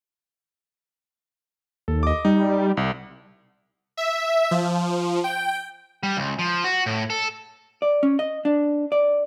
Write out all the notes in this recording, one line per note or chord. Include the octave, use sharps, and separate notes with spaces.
D#2 A4
D#5 D6
G3 D#4
C2
E5
F3
G5
G3
C#2
F3
F#4
A2
A4
D5
C#4
D#5
D4
D5